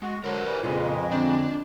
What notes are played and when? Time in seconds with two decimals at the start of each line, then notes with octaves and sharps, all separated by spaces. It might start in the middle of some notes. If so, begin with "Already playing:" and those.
0.02 G#3 F#4
0.24 D3 F#3 A#4 C5 C#5
0.44 E3 G3
0.63 F2 A#2 C#3 G#3 F4 G#4 B4
1.11 D3 C4 D4 G#4